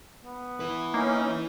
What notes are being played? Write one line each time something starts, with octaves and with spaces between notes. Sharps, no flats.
B3
E4 B4
E3 A#3 C#4 D#4